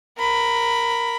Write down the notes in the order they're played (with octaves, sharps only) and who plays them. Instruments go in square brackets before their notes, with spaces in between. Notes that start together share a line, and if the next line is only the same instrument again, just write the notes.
[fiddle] A#4 B5